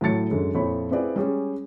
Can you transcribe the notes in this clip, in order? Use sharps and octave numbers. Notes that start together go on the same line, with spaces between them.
A2 F#3 A5 A6 C#7
F#2 D3 G#3
F2 A#2 F3 E4 C#5 B5
C4 E4 F4 G#4 B4 D5
G3 G#3 C#4 G#4